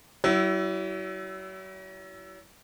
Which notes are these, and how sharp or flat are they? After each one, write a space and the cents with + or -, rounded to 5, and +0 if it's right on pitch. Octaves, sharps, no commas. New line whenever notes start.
F#3 +40 E4 +0